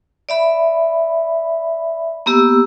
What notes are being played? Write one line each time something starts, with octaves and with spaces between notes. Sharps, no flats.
D5 E5 B5
A#3 B3 G4 E6